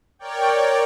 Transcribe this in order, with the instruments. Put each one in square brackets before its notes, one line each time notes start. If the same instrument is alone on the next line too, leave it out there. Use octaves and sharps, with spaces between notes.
[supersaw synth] A#4 C#5 D5 G5